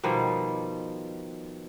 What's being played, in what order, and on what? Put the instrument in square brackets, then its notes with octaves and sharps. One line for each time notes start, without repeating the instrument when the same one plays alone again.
[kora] B2 D#3 F3 G3